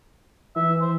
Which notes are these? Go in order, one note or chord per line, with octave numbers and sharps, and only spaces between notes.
E3 E5
C5